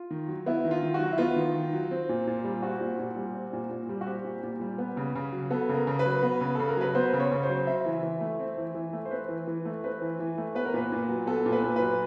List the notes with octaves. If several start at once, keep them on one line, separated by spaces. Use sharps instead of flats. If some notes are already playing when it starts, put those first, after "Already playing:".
Already playing: F4
D#3
F#3
B3 E4
D#3
F4
D#3
F#4
F#3
E4
B3 F4
D#3
D#3
F#3
C4
A#2
A#2
G3
C4 F#4
A#2
A#2
G3
C4
A#2
A#2
G3
F#4
C4 G4
A#2
A#2
G3
B3
C#3
C#3
F#3
B3 A4
C#3
A#4
C#3
B4
F#3
B3
C#3
C#3 A4
A#4
F#3 B4
B3 C5
C#3
C#5
C#3
C5
F#3
C4 E5
E3
E3
A3
C4
E3
E3
A3
C5
C4 B4
E3
E3
A3
C4 B4
E3
E3
A3
B3 B4
A#4
A#2 B4
A#2
F#3
B3 A4
A#2
B4
A#2
B4
F#3